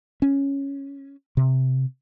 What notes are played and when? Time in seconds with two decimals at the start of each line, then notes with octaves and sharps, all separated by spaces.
0.22 C#4
1.37 C3